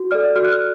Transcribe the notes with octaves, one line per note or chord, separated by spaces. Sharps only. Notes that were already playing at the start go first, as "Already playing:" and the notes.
Already playing: F#4
A4 D5 F6
F#4 F6
F#6
F6